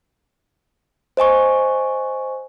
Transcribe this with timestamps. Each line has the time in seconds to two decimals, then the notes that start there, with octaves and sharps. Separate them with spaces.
1.17 C5 D#5 G#5 C#6